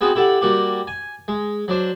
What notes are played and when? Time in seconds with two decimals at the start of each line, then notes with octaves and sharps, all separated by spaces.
0.01 B3 C4 F#4 G#4
0.16 E4 G4 A4 F#5
0.41 G3 A#3 F#4 G4
0.87 G#5
1.28 G#3
1.68 F#3 D4 C5